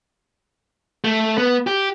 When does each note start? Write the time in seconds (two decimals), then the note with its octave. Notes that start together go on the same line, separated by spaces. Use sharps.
1.04 A3
1.38 B3
1.67 G4